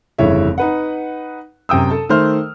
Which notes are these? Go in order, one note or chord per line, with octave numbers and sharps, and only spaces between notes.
F1 G2 C#3 E3 C#5 E5
D#4 B4 F#5
F#2 C3 G5 D#6 E6
A4 A5
D#3 A3 C5 F6